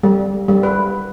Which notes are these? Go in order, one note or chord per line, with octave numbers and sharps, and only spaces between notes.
G3
G3
B4